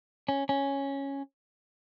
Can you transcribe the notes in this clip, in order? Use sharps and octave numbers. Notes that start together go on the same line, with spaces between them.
C#4
C#4